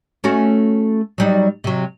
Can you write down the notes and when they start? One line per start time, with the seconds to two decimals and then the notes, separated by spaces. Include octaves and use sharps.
0.24 A3 C#4 F#4
1.18 F#3 G3 D#4
1.64 C3 F#3